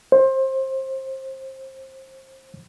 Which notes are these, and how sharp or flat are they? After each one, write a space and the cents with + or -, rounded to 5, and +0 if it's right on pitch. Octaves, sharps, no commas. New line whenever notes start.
C5 +25